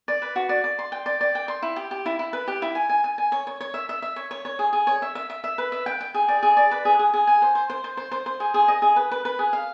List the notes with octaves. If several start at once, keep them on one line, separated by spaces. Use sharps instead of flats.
D5
B4
F#4
D5
D5
C6
G5
D5
D5
G5
C6
E4
G4
G4
E4
E4
B4
G4
E4
G#5
G#5
G#5
G#5
C#5
C#5
C#5
E5
E5
E5
C#5
C#5
C#5
G#4
G#4
C#5
E5
E5
E5
E5
B4
E5
G5
G5
G#4
D5
G#4
D5
B4
G#4
G#4
G#4
G#5
C5
C5
C5
C5
C5
C5
C5
G#4
G#4
D#5
G#4
B4
B4
B4
G#4
F5